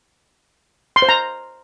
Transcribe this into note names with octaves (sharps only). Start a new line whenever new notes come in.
C6
C5
A#5